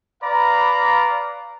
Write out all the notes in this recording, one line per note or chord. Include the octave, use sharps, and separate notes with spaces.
B4 D5 F5 A#5 B5